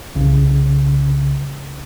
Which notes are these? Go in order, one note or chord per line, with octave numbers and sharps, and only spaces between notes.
C2 C#3